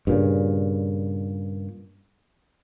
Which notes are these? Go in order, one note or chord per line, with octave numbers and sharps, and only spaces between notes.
G2 A#2 C#3